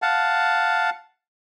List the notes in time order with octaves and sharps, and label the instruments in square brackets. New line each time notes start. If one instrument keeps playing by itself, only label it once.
[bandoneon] F5 F#5 A5